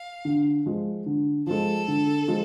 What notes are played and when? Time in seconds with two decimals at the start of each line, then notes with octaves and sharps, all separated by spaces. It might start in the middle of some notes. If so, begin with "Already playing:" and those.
Already playing: F5
0.25 D3
0.66 F3 G#3
1.06 D3
1.47 F3 G#3 A4
1.88 D3
2.28 F3 G#3